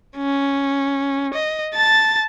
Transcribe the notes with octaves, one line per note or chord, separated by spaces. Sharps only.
C#4
D#5
A5 A6